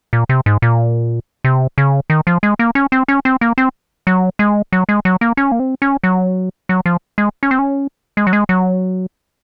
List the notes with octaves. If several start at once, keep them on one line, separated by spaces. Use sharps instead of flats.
A#2
C3
G#2
A#2
C3
C#3
D#3
F3
G#3
A#3
C#4
C4
C#4
C4
A#3
C4
F#3
G#3
F#3
G#3
F#3
A#3
C#4
A#3
C4
C#4
F#3
F#3
F3
G#3
C#4
C4
C#4
G#3
F#3
G#3
F#3